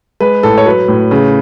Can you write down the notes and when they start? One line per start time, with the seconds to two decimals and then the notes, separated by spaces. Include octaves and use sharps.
0.20 G#3 B4
0.43 A2 A4
0.58 C#5
0.66 F#3 B4
0.88 A2
1.11 C#3